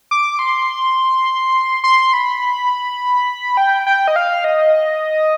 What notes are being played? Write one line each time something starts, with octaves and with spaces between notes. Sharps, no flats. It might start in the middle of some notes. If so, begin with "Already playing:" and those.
D6
C6
C6
B5
G5
G5
D#5
F5
D#5